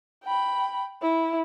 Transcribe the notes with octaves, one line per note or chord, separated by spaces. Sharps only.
G5 B5
E4